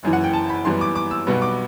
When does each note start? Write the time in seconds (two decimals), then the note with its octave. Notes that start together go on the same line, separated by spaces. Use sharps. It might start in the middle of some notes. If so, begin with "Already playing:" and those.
0.03 F#1 F#2 E3
0.13 F#5
0.24 G5
0.33 A5
0.49 B5
0.65 F#2 E3 G3 B3 C6
0.81 D6
0.95 D6
1.11 E6
1.27 B1 B2 G3 B3
1.42 D6